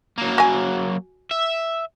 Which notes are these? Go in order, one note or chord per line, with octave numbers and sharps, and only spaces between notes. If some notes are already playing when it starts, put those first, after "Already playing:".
F#3 A#3
F#4 G#5
E5